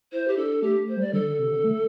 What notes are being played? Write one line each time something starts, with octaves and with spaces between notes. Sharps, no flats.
E4 C5
G4
D4 A4
A3 G4
A3
C5
G3 D5
D3 A4
D3
C3
D3
A3